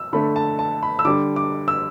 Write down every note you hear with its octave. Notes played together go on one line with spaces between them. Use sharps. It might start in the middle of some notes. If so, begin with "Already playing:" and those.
Already playing: E6
D3 A3 B5
A5
A5
B5
E6
D3 G3 D6
D6
E6